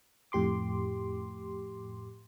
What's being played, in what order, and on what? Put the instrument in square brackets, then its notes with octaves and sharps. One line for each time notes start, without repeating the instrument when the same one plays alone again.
[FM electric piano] F2 A2 G4 C6 D6